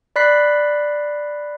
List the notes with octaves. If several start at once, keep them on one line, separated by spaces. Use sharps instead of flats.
D5 B5 F#6 B6 C7